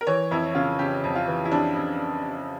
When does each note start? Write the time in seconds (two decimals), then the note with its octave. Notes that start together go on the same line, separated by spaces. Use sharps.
0.01 A#4
0.07 E3 C#5
0.31 F2 E4
0.55 C#3 F4
0.79 C#3 G4
1.04 F2
1.15 F4
1.28 E3
1.45 E4
1.51 F2 D4
1.75 F2